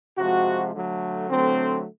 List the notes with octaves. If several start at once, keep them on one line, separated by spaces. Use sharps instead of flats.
C3 F3 G#3 F#4
D3 F#3 A3
D3 F#3 A3 C4